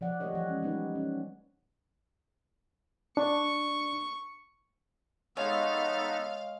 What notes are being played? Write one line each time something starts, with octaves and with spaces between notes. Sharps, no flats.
F3 D5 F#5
G3 A3 G4 A#4 C#5 D#5
E3 F3 G3 C#5 F#5
G#3 C#4
G3 A3 B3 D#4 B4
C#4
D4 C#6
G#3 B3 D#4 A4 C#5 F5